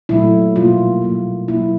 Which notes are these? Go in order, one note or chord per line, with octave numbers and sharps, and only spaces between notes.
A#2 F#3 A3 E4
B2 G3 A#3 F4
B2 F#3 A#3
B2 F#3 A#3 E4